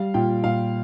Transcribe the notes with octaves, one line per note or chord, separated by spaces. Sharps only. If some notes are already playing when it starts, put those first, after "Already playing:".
Already playing: G3 F5
A#2 G5
A#2 F5